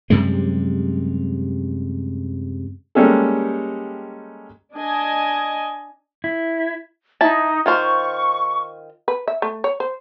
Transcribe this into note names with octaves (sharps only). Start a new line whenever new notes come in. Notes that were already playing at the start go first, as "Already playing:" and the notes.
F#2 C3 G3 G#3
G3 G#3 A#3 C#4 G4 A4
D4 D#5 G#5
E4
D#4 E4 A5
D#3 F4 C5 C#6
B4
E5
A3
C#5
C5